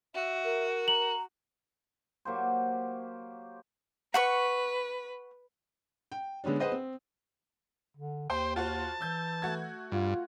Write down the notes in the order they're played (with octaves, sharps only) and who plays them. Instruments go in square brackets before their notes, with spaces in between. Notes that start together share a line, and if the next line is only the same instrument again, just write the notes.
[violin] F#4 [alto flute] E5
[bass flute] A#4
[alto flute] A#5 [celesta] F#7
[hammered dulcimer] F#3 A#3 G4 C5
[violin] B4 [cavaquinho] F#5 B5 C#6
[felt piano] G5
D3 G#3 B3 C#4 D4
G#4 B4 C5 D#5 F#5
C4
[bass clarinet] D3
[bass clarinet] D#2 [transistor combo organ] C5 [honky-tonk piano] G5
[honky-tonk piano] F4 F#4 C5 [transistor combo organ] A5
[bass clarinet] E3 [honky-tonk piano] E6 G6
[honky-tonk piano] A3 F#4 G#6
[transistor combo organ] G2 [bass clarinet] F4